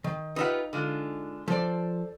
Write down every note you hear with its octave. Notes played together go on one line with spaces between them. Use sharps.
D#3
D#4 F4 G4 B4 E5 F#5
D3 G#3 F4
F3 A4 C5 D5